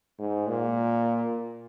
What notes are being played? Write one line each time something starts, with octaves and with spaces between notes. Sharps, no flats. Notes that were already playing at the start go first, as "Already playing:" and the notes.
G#2
A#2